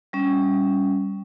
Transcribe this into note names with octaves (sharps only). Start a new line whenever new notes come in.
G3 C#4